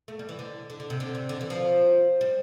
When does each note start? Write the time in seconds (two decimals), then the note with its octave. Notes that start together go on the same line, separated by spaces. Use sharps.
0.08 A3
0.19 G3
0.29 E3
0.39 D3
0.70 D3
0.80 D3
0.90 C3
1.00 D3
1.15 C3
1.29 D3
1.41 E3
1.50 F3
2.21 G3